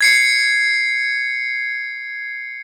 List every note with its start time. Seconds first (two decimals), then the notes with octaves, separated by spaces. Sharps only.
0.01 G#6 C7 C#7